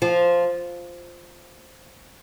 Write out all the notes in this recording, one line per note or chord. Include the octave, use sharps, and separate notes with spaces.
F3